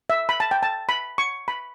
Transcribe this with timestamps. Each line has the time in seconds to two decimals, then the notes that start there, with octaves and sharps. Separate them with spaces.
0.10 E5
0.29 B5
0.40 A5
0.51 G5
0.63 A5
0.89 B5
1.18 C#6
1.48 B5